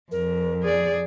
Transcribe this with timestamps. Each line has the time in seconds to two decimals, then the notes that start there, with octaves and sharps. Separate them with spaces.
0.12 F2 A#4
0.62 G#4 D5